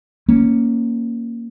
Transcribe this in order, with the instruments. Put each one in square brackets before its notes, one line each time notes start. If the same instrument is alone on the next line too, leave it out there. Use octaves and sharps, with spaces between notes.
[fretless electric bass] A#3 C#4